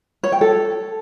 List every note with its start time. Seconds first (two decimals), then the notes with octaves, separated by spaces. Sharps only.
0.24 C#5
0.32 G5
0.41 A4